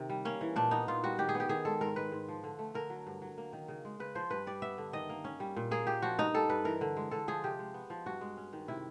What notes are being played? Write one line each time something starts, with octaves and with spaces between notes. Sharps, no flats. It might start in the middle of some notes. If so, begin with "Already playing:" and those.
Already playing: C3 D#3
G3
A#3 C#4
E3
A#2 D4
B3 D#4
A#2 F4
G3 F#4
D#3 G4
G#4
B3
G4
D#3 G#4
G#3 A4
G#2 A#4
G#3 B4
G#2
F3
D3
A3
D3 A#4
F#3
G2
F#3
A#3
D#3
C#3
G#3
C#3 B4
F3 C5
G2 B4
G3 D5
B3 E5
D3
D#3 D#5
A#3
C#4
G3
A#2
A#3 G#4
A#2 G4
F3 F#4
G2 D#4
G3 A4
G2 B4
E3 A#4
D3
G#3
D3 A4
F3 G#4
C3 G4
G#3
B3
F3
G2 F#4
G#3
C#4
D#3
C3 E4